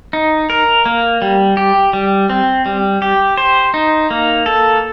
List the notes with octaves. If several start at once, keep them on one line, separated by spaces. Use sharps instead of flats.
D#4
A#4
A#3
G3
G4
G3
C4
G3
G4
C5
D#4
A#3
A4